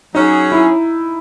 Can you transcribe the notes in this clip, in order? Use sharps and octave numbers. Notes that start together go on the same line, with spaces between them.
F#3 C#4 D#4 G#4
E4